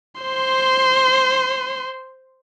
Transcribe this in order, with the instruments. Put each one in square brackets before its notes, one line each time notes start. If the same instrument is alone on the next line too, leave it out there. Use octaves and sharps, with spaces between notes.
[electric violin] C5 C6